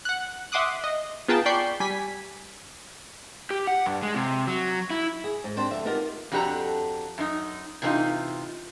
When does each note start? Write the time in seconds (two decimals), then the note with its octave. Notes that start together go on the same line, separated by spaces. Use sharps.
0.05 F#5 F#6
0.52 E5 F#5 C6 D6 D#6 F#6
0.84 D#5
1.28 B3 F4 G#4 A#4 G5 A5
1.46 D5 G5 B5 C#6 G6 C7
1.80 G3 G#5 B6
3.50 G4
3.67 F#5
3.86 G2
4.02 G#3
4.15 C3
4.47 F#3
4.90 E4
5.24 G#4
5.44 G#2
5.57 C4 D4 G4 C5
5.70 F2 D3 E5
5.85 B3 D#4 F4 G4 A#4
6.32 F2 D4 F#4 G4 A4 A#5
7.18 F#2 D#4
7.82 C3 E3 F#3 C4 D#4 F4